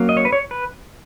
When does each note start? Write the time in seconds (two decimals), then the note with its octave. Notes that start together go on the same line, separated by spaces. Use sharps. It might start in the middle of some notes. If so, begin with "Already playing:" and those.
Already playing: F#3 A#3 C#4
0.09 D#5
0.17 C#5
0.25 B4
0.32 C#5
0.51 B4